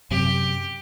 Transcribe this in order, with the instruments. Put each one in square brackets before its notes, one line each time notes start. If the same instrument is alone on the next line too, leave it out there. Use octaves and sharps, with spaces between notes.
[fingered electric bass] F#2 C3 [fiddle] G4